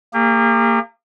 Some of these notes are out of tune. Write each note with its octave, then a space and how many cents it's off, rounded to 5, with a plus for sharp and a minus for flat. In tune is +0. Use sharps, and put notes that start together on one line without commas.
A#3 -25 G4 +45